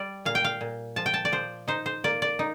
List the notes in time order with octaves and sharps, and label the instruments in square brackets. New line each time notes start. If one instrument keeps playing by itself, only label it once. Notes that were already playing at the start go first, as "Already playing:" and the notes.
Already playing: [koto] G3 D5
A#2 F5
G5
F5
A#2
F3 A5
G5
A5
D5
F3 C5
D#4 C5
C5
A#3 D5
D5
D#4